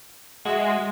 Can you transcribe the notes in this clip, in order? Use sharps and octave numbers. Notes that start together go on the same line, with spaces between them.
G#3 F#4 E5